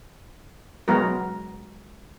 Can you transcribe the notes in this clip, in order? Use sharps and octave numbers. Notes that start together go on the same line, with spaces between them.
F#3 G#3 B3 F#4 A#4